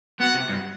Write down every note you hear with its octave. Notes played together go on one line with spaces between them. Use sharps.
B3 F#4 F#5
C3
G2